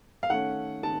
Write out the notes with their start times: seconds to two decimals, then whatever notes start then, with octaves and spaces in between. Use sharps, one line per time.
0.23 F5
0.30 D#3 A3 C#4 F#5
0.83 D#3 A5